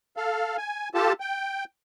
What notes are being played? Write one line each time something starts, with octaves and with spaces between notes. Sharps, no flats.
A4 F5
G#5
F4 G4 A4 A5
G5